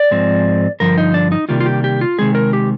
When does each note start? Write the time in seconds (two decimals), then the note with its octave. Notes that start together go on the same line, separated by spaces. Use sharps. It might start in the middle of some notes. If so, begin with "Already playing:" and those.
Already playing: D5
0.11 G#2 F3 G#3 C4
0.80 G2 D3 F3 A#4
0.98 D#4
1.14 D4
1.32 D#4
1.49 C3 D#3 G3 A#3 F4
1.60 F4
1.66 G4
1.84 G4
2.01 F4
2.18 C3 D#3 G#3 C4 G#4
2.35 A#4
2.53 G4